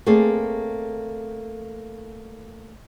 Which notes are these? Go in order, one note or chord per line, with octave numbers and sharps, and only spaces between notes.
A3 A#3 C4 G#4 D5